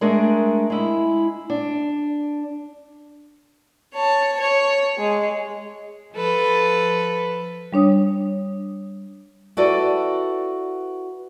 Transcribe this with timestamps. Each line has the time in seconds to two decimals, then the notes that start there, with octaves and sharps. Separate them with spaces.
0.01 G#3 A3 D4 G#4 A#4
0.70 G#3 E4
1.50 D4
3.94 C#5 A5
4.40 C#5
4.98 G#3
6.14 F3 A4 B4
7.73 G3 D4 C#5 D#6
9.57 E4 F#4 A4 B4 D5